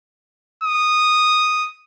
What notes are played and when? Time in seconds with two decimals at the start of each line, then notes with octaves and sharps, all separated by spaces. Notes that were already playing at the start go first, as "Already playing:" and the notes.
0.64 D#6